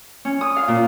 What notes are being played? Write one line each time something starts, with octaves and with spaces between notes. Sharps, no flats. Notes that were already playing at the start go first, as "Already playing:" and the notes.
C#4
D#6
F5
A#2